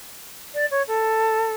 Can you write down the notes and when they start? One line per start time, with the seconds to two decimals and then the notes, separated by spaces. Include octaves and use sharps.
0.54 D5
0.71 C#5
0.88 A4